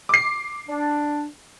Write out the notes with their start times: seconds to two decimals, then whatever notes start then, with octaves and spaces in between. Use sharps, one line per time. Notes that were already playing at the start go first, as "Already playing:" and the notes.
0.09 D6 C7
0.69 D4